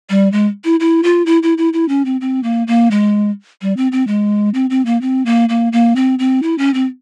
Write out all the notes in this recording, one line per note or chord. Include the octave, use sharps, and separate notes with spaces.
G3
G#3
E4
E4
F4
E4
E4
E4
E4
C#4
C4
C4
A#3
A#3
G#3
G3
C4
C4
G#3
C4
C4
A#3
C4
A#3
A#3
A#3
C4
C4
E4
C#4
C4